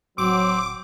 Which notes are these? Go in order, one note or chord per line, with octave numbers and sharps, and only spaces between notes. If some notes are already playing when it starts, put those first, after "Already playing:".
D1 F#3 C4 D6